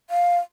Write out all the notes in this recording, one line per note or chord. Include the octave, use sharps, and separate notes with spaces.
F5